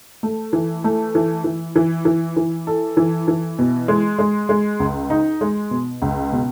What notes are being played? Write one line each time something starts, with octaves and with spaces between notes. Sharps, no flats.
A3
E3
A3
E3
E3
E3
E3
E3
A4
E3
E3
B2
G#3
G#3
G#3
C#2
D#4
G#3
B2
C#2
B2